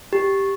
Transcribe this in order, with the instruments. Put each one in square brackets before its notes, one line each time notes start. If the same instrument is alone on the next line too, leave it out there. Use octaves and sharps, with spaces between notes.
[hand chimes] G4